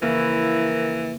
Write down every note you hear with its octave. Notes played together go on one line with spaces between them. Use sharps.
C#3 E3 F3 A#3 E4 A#4